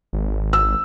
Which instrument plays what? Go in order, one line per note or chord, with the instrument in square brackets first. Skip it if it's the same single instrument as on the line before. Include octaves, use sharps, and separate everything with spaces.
[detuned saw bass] G#1
[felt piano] E6